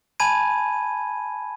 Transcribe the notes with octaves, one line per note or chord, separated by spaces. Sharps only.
G#5 A5 B5 G#6 D#7